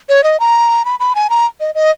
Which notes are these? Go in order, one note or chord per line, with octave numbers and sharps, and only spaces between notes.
C#5
D#5
A#5
B5
B5
G#5
A#5
D#5
D#5